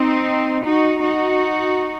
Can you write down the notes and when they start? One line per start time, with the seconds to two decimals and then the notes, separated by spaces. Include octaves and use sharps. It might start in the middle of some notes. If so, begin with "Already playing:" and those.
Already playing: C4 D#4
0.64 D#4 F#4
1.02 D#4 F#4